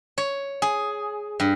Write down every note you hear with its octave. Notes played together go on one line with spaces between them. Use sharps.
C#5
G#4
G2